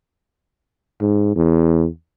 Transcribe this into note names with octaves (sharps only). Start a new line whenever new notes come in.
G#2
E2